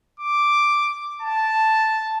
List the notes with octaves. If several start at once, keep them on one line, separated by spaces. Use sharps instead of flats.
D6
A5